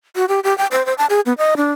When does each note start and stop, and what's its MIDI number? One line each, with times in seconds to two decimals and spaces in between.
0.16 0.25 66
0.29 0.40 67
0.44 0.56 67
0.58 0.67 79
0.72 0.85 72
0.86 0.94 72
0.98 1.06 81
1.10 1.21 68
1.26 1.33 59
1.38 1.55 75
1.57 1.72 62